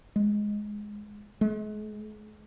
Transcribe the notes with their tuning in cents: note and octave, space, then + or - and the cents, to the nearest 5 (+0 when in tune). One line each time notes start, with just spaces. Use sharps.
G#3 +5
G#3 +40